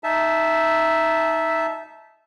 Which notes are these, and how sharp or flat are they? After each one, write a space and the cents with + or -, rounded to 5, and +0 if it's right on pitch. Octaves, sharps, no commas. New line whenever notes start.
D#4 +0 E5 +0 A5 -20